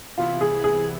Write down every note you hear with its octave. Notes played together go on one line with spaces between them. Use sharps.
C2 C3 E3 B3 E4 F4
G#4
G#4